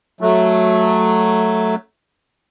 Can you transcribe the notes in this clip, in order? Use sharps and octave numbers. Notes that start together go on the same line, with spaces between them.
F#3 A3